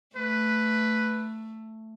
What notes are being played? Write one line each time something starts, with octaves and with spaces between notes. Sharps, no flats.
A3 B4